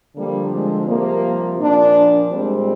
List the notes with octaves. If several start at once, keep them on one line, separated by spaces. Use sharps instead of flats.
D3 F3 G3 A#3
G#3 C4
C3 F3 G3 A#3
A#2 F3 A#3 D4
A#2 G3 G#3 C4